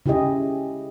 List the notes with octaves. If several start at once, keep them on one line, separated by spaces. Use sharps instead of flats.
C#3 E4 G4 G#4 D#5